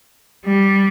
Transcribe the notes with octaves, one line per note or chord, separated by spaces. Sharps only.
G3